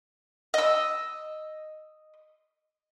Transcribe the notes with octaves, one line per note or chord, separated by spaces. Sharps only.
D#5 E6